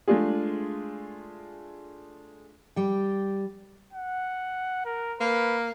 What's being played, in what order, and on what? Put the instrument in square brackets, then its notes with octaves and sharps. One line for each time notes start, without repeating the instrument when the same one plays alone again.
[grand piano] G#3 A3 D4 F4 G#4
[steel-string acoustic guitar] G3 G5
[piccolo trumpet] F#5
A#4
[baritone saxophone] A#3 [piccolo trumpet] B4